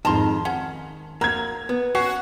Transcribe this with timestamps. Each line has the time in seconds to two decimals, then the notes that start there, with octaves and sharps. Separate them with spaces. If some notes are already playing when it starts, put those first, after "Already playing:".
0.05 F2 G#2 D#3 A5 A#5 C6
0.45 C#4 F#5
1.21 F#3 A#3 A#5 G#6
1.69 B3
1.95 C#4 F#4 C7